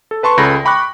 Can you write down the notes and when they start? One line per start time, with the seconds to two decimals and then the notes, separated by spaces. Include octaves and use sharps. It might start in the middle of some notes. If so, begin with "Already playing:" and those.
0.11 A4
0.23 B4 A5 C6 C#6
0.37 C#2 C#3 A4 B5 A#6
0.65 G5 B5 C#6 D6 F#6